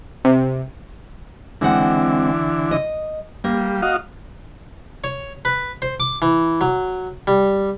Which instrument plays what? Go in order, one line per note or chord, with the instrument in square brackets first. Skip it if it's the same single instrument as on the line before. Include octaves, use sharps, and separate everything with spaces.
[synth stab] C3
[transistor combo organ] D3 E3 [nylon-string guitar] G#3 C4 F#5
[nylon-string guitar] D#5
[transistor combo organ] G3 [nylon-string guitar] A#3
[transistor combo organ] F#4 D#5 F5
[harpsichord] C#5
B4
C5
D6
E3
F#3
G3